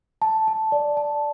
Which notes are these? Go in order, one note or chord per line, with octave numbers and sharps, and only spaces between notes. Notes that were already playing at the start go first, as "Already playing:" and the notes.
A5
A5
D5
A5